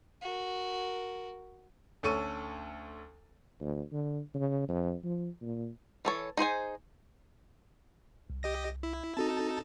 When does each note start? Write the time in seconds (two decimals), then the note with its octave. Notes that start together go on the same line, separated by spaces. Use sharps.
0.22 F#4 A#4
2.03 D2 C#4 A4 C#6 D#7
3.61 D2
3.92 D3
4.34 C#3
4.68 F2
5.04 F3
5.42 A#2
6.05 E3 A4 C#5
6.37 D#4 G#4 C5 G#5
8.30 C2
8.43 G4 D#5 A#6
8.83 E4
9.17 C4 D#4 F#4 A4 A5